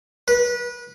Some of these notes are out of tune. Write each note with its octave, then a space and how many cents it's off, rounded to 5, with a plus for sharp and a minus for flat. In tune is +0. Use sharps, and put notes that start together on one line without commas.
B4 -25